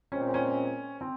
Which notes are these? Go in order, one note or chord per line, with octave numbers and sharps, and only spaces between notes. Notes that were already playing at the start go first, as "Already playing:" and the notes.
A#2 G#3 C4 C#4
C#4
C4